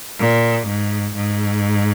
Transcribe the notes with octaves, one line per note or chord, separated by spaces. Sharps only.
A#2
G#2
G#2